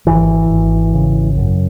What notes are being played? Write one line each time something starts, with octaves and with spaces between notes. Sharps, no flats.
G#1 E3
G#1
C#3
F#2